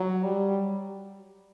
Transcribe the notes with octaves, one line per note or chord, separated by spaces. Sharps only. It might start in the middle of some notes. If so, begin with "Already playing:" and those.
Already playing: F#3
G3